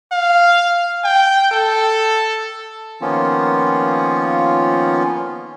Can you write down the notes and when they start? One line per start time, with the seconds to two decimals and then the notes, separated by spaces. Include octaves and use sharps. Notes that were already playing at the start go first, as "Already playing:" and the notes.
0.12 F5
1.04 G5
1.51 A4
3.01 D#3 F3 A#3 B3 C#4 F4